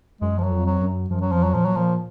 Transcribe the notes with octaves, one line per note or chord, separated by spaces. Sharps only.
F#2 G#3
F3
F#3
F2
F#3
F#2
F#2 F3
F#3
F2 F3
F#3
A#2 F3
F#3
A#2 F3